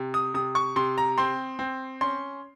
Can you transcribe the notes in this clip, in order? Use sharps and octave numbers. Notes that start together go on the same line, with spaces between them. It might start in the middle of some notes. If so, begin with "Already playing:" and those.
Already playing: C3
D#6
C3 D#6
C#6
C3 C6
A#5
C4 C6
C4
C#4 C6